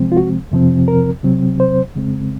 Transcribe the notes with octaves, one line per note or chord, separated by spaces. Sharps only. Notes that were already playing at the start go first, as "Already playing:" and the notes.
Already playing: C3 F3 G#3 C4
F4
F#4
F2 C3 F3 C4
A#4
C3 F#3 C4
C5
F2 C#3 G#3 C4